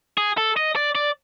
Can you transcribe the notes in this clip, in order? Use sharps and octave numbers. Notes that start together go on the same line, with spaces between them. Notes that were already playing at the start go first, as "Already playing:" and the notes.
G#4
A4
D#5
D5
D5